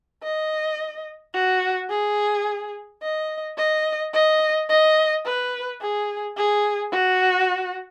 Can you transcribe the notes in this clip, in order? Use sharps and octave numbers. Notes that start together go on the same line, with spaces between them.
D#5
F#4
G#4
D#5
D#5
D#5
D#5
B4
G#4
G#4
F#4